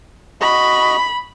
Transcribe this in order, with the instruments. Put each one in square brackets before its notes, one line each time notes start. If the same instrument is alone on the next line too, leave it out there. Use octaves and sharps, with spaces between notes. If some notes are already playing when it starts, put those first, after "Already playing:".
[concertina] F#4 D#5 [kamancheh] B5